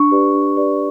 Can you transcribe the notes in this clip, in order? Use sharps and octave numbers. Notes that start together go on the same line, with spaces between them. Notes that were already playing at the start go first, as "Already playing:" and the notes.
Already playing: D4 C#6
G4 B4 D5
D4
G4 B4 D5